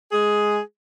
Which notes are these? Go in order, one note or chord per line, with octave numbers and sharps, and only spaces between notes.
G#3 G#4